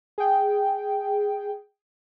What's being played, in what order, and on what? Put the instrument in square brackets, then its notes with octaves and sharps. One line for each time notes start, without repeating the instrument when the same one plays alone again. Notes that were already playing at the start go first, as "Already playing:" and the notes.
[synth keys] G#4 G5